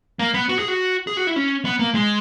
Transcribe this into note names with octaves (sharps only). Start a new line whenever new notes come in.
A#3
B3
F#4
G#4
F#4
G#4
F#4
E4
C#4
B3
A#3
G#3